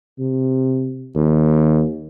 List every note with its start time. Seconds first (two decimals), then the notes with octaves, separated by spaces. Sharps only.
0.19 C3
1.15 D#2